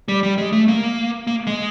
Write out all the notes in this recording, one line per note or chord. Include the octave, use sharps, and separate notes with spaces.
G3
G3
G#3
A3
A#3
A#3
G#3